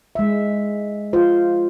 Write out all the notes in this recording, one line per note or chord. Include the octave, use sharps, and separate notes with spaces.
G#3 E5
F4 C5